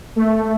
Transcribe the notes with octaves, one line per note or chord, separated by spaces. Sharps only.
A3